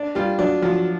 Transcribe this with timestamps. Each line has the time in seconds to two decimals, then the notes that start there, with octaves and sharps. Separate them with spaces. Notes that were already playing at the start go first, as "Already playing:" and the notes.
Already playing: D4
0.15 G3 F4
0.39 F#3 D4
0.62 F3 F#3